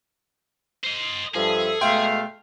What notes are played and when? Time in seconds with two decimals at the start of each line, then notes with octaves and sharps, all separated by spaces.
0.84 C5 D#5
1.34 G2 F3 G#4 A4 E5
1.81 B2 G#3 A3 F5 G5 C6